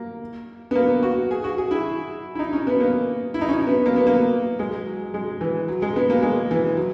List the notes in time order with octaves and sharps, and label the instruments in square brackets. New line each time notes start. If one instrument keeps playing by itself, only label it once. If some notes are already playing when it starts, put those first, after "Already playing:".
Already playing: [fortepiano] A#3
B3
A#3
F#4
G#4
F#4
G#4
E4
E4
D#4
C#4
B3
A#3
E4
D#4
C#4
B3
A#3
B3
A#3
G#3
F#3
G#3
E3
F#3
G#3
B3
A#3
G#3
E3
F#3